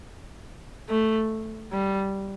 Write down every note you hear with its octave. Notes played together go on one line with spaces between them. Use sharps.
A3
G3